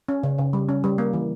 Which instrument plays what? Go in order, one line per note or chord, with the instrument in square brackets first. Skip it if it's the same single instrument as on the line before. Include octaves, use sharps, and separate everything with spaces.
[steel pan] C#4
C#3
C#3
G3
C#4
G3
A#3
E3